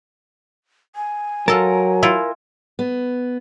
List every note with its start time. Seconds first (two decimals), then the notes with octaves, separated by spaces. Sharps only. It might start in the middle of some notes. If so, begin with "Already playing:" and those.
0.96 G#5
1.48 F#3 F4 A4 A#4 A5
2.03 E4 F4
2.79 B3